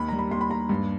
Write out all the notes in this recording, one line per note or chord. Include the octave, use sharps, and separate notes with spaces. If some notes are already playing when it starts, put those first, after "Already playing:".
Already playing: D#2 B5
G3 A#5
B5
D#2 C6
B5
D#2 A#5
G2